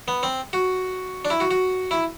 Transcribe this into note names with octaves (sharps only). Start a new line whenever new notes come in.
B3
C4
F#4
D4
E4
F#4
F#4
E4